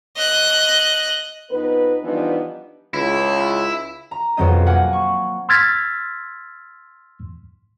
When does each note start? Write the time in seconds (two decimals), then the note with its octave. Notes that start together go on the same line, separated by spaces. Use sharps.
0.17 D#5 F#6
1.50 F2 B3 D#4 B4
2.03 E3 F3 G3 B3 D4 D#4
2.94 C#2 E4
4.11 A#5
4.37 B1 F2 F#3 C4 D#5
4.66 A#3 F#5 G#5
4.93 C#6
5.49 C6 E6 F6 G#6 A6 B6